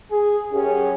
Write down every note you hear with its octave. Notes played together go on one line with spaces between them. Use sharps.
G#4
F#2 C#4 G4 G#4